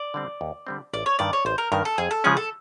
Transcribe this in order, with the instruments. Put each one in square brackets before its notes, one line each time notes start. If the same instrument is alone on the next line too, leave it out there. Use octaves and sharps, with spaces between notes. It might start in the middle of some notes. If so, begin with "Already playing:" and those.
Already playing: [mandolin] D5
[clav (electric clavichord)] D3 G3 C4
D#2
D3 G3 C4
[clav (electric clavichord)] A1 [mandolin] D5
[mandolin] C#5
[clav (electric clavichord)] G2 D#3 [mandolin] D5
[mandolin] C#5
[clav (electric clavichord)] A1 [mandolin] C5
[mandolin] A#4
[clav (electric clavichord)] G2 D#3 [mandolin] A#4
[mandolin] A4
[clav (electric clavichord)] F2 [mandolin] G#4
[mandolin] A4
[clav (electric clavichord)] C#3 F3 G#3 C#4 [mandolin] G#4
[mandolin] A4